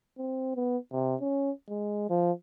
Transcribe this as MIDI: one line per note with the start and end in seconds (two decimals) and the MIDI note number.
0.18 0.54 60
0.56 0.78 59
0.92 1.15 48
1.21 1.51 61
1.69 2.08 56
2.10 2.32 53